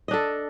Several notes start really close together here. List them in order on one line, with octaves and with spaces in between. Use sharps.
D#5 D4 A4